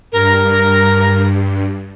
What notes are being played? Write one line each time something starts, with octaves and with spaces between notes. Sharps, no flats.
G2 A#4